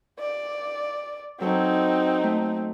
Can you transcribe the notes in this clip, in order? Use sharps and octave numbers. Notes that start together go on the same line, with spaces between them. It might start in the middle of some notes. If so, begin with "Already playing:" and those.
D5
F#3 C4 D#4 A4 C#5
A3